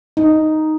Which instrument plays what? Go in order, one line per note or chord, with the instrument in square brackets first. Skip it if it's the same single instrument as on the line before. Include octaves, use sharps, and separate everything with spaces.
[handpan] D#4